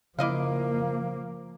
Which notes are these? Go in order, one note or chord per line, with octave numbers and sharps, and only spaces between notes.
C#3 F3 A#3 E4 D#5 F5 D6